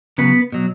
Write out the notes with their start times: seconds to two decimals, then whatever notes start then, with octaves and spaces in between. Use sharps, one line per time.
0.18 C#3 F#3 B3
0.52 B2 F#3